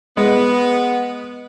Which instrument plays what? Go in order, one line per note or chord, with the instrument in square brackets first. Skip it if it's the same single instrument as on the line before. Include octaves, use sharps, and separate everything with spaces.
[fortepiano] G#3 [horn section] B3